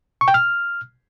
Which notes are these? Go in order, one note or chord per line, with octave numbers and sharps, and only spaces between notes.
C#6
G5
F6